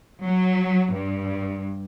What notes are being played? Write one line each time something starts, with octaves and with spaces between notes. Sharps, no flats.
F#3
G2